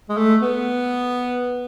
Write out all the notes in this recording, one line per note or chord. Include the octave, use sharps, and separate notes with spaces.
G#3
A3
B3